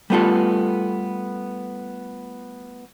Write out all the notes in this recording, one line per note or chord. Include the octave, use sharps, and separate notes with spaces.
G3 A3 B3 F4 A4